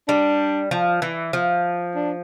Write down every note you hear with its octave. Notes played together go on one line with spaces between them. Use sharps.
G3 D4
F3
E3
F3
D4